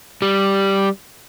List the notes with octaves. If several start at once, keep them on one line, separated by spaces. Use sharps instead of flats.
G3